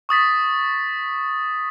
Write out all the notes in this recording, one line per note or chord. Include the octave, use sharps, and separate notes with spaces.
C#6 D#6 A6 B6